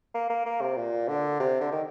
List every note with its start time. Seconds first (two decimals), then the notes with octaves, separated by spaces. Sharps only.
0.14 A#3
0.30 A#3
0.45 A#3
0.61 C3
0.77 A#2
1.08 D3
1.40 C3
1.60 D3
1.72 D#3